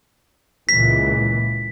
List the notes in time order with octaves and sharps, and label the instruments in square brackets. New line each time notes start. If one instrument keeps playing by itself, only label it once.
[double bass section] C#2 A#2 E3 [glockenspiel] B6